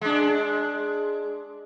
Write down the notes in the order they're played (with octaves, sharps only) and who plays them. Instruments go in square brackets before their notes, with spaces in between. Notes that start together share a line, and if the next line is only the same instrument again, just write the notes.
[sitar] G#3 D4